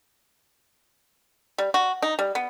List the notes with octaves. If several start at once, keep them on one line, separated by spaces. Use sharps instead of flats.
G3
F#4
D#4
G3
B3